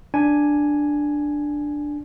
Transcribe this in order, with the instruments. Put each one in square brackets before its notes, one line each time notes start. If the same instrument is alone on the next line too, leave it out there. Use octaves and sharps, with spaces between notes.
[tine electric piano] D4 G#5